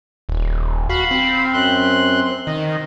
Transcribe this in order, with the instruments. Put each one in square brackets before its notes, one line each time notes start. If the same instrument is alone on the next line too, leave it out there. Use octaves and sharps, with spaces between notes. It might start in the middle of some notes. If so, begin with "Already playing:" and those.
[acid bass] D#1
[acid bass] F#4 [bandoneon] F5 B5
[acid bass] C4
[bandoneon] F#2 C6 F#6
[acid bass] D#3 [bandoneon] D#5